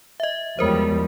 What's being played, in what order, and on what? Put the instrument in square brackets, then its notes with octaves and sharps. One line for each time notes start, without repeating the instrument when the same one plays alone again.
[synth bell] D#5 E5
[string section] E2 F3 G3 [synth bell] G#3 A#4 C5